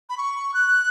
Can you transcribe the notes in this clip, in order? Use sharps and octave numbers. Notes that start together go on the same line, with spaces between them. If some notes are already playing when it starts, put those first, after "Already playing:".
B5
C#6
F#6